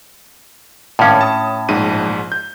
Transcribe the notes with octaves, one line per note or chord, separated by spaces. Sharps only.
G#1 A2 C#4 F5 D6
A5 D#6
A#1 G#2 D#7
G6